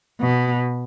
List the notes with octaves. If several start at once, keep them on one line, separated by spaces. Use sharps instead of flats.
B2